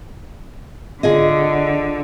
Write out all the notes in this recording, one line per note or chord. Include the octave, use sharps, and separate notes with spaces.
D3 F4 G#4 D#5